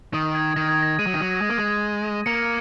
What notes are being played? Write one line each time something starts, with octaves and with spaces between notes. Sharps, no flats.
D#3 D#6
G#6
D#3 A#6
G#6
A#6
G#3 D#7
F#3
D#3
F#3
G#3
A#3
G#3
A#3 C#7